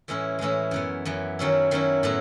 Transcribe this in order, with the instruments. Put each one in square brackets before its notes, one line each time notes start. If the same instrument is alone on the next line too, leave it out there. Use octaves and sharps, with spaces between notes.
[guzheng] A2 E3 G#3 C#4 E4
A2 E3 G#3 C#4 E4
F#2 E3 B3
F#2 E3 B3
D#3 F#3 C#4 E4
D#3 F#3 C#4 E4
A2 F#3 B3 E4